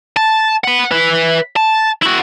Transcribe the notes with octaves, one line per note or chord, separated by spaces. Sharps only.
A5
F#5 B5
B4 E5
A5
E4 F#4